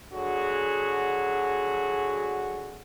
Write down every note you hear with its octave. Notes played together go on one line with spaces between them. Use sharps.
D3 F#3 F#4 G#4